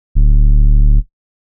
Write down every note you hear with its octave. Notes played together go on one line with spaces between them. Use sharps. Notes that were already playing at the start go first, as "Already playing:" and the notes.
D1